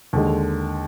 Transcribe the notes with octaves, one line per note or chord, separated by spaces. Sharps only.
D#2 D3 G#3